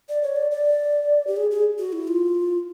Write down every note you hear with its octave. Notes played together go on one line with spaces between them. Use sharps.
D5
C#5
D5
D5
G4
G#4
G#4
F#4
E4
F4